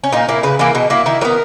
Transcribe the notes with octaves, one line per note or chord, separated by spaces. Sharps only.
C#4
A#2 D#4
A#3 E4
C#3 B4
E3 A#3 E4
B2 D#4
A#3 E4
D#3 E4
F#3 B3 A#4